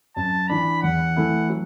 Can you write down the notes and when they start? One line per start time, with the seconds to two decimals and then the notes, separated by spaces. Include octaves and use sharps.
0.16 F#2 A5
0.49 E3 D4 B5
0.82 E2 F#5
1.16 E3 A3 E4
1.49 F#3